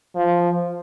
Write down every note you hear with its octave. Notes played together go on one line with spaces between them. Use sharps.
F3